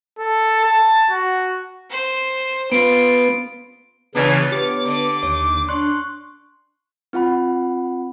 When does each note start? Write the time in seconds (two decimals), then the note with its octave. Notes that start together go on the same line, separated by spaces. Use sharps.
0.19 A4
0.64 A5
1.11 F#4
1.90 C5
2.72 B3 F4 D7
4.15 C#3 E3 B3 D4 F4 C#5
4.52 G4 D6
4.85 D3
5.23 D#2 C#5
5.69 D4 C6 C#6 F#6
7.13 C4 F4 F#5 B5